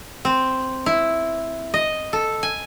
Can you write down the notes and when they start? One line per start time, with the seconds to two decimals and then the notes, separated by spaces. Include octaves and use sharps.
0.25 C4
0.86 E4
1.74 D#5
2.13 A4
2.43 G#5